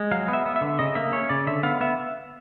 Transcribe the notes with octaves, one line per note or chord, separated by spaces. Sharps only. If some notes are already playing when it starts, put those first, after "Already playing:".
Already playing: G#3
F#3 F5
B3
E5
B3
E5
D3
C#3 D#5
A#3 E5
C#4 C#5
C#3 D5
D3 E5
B3 F5
B3 E5